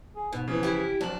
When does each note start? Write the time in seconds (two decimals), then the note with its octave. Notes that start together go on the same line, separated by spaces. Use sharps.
0.16 G#4
0.33 G#2 B2
0.48 C#3 E3 F3
0.63 E4 G4
1.01 D1 F3 F#3 D4 F#7